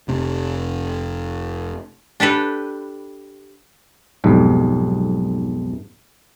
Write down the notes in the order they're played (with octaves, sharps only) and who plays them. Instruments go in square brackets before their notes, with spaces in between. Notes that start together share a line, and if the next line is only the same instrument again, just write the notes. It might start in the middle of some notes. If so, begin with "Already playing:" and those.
[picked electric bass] F1 C3
[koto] D4 G4 A4 B4
[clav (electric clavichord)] B1 F2 G#2 G3